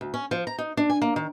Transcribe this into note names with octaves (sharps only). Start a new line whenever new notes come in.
D2
C#4
F3
A#5
D#4
D4
G#5
A#3
D#3